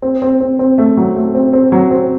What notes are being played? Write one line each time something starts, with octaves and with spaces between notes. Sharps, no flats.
C4
C4
C4
C4
A3
F#3
A3
C4
C4
F#3
C4